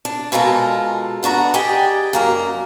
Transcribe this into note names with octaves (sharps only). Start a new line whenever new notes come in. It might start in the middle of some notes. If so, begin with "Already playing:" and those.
D4
B2 G#3 F4 A4 A#4
B3 D4 F#4 A#5
G4 G#4 D5 D#5 G5
F#2 A#3 A#4